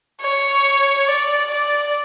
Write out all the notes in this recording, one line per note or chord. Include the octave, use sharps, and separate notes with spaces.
C#5
D5
D5